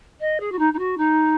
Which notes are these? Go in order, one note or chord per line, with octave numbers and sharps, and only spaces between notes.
D#5
G#4
F#4
D#4
D#4
F#4
D#4